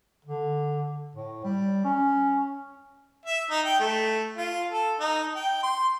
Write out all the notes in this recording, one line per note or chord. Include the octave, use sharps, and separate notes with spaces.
D3
A2
G3
C#4
E5
D#4
G5
A3
F4
A4
D#4
G5
C6